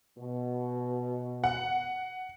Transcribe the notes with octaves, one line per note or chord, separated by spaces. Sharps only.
B2
F#5